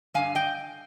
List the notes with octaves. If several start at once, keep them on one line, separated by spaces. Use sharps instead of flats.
G2 D3 G#3 F5 G#5
D#5 G5